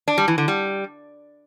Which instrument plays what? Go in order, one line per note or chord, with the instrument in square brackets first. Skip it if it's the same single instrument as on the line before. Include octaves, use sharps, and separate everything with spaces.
[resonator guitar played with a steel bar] D4
G3
E3
D3
G3